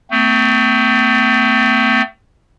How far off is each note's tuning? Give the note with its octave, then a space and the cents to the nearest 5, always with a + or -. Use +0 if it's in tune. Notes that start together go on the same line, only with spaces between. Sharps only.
A3 +30 C4 -40